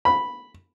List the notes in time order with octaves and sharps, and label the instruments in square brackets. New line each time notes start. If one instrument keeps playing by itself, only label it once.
[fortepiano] B5